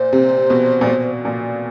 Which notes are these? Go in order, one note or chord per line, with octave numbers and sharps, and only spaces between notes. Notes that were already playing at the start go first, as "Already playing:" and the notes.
Already playing: A#2 C5
C3
B2
A#2
B2
A#2